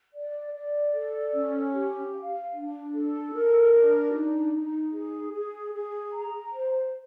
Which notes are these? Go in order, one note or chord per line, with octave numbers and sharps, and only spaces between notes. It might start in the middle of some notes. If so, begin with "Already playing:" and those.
D5
D5
A4
C#4
G4
F5
D4
A4
A#4
D4
D#4
D#4
G#4
G#4
G#4
A#5
C5